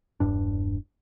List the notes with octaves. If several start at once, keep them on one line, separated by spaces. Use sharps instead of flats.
E1 G2 D4